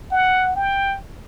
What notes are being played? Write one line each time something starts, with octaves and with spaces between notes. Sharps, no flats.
F#5
G5